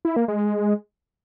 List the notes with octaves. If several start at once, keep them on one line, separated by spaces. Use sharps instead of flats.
E4
A#3
G#3